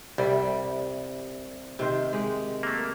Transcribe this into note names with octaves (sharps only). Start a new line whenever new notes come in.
C2 C3 G3
C3 D#3 C5
G#3 G4
A3 A#3